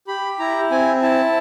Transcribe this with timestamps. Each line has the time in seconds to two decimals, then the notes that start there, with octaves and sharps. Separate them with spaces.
0.08 G4 B5
0.39 E4 A#5
0.71 C4 G#5
1.02 E4 A5